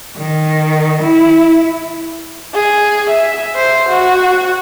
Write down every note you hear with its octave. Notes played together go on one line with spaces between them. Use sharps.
D#3
E4
G#4
E5
C5
F#4